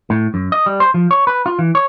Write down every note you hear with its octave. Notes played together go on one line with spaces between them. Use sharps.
A2
F#2
D#5
G3
C5
F3
C#5
B4
F4
E3
C#5